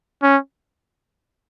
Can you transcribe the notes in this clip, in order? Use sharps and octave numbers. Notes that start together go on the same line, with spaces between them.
C#4